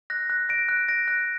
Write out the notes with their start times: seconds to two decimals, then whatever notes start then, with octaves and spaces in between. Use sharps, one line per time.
0.10 F#6 A#6
0.30 F#6
0.49 A#6 D7
0.69 F#6
0.89 A#6 D7
1.08 F#6